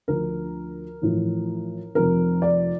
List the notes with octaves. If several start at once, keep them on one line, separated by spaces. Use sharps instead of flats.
D2 D3 F3 A#4
A1 A2 F3
F1 F2 C3 A#4
D5